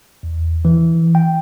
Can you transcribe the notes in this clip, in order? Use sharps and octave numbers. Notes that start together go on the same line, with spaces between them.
E2
E3
G5